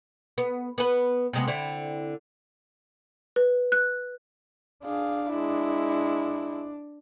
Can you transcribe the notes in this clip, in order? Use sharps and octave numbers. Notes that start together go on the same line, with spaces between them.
B3
B3 B4
C3 G#3 B3
D3 C4 E4
B4
F#6
D4 G#4 F5
G#3 E4